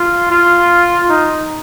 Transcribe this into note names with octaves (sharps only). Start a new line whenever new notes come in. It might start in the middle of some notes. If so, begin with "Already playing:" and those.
Already playing: F4
F4
D#4